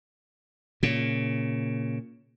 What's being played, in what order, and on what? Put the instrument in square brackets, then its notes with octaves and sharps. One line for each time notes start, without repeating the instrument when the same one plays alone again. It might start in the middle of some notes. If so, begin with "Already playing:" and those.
[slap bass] A#2 C#3